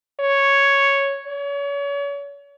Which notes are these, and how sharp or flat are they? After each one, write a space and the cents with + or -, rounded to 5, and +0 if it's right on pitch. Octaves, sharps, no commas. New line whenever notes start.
C#5 +0
C#5 +35